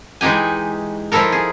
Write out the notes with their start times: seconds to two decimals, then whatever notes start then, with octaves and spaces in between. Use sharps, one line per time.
0.21 E3 G#3 D#4 G4 G#5
1.12 F3 D#4 E4 A4 A#4
1.32 G#4